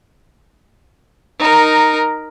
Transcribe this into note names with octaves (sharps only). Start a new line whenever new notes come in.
D#4 A#4